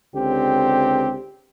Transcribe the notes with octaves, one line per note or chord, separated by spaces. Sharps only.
C#2 D3 C4 G4